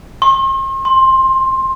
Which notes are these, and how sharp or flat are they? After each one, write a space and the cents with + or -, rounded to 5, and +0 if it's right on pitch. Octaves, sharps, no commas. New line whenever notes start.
C6 +45
C6 +15